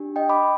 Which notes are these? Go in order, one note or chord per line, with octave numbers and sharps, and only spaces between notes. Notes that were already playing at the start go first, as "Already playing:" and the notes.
Already playing: D4 G4
D#5 G5
B5 D6